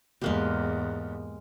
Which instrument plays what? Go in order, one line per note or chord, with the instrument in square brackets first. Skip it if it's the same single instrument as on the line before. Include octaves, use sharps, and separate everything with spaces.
[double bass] E2 G#2 [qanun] G#3 A#3 G4